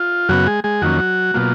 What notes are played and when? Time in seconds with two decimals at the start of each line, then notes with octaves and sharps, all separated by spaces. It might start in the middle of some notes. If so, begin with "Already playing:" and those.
Already playing: F4
0.29 F#2 C#3 F#3 B3 F#4
0.47 G#3 G#4
0.64 G#3 G#4
0.82 F2 D#3 F#3 A#3 C#4 F#4
1.34 B2 F#3 A#3 F4